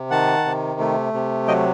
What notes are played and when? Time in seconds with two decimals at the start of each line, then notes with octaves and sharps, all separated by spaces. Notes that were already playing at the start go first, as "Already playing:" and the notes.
Already playing: C3
0.11 D#3 F#5 A5
0.45 C3
0.80 A3
1.13 C3
1.48 F#3 D#5 G5